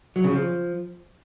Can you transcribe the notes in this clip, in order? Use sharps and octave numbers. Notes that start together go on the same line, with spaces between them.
F#3
C#3
F3